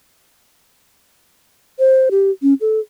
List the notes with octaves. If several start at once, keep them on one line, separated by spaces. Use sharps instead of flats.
C5
G4
C#4
A4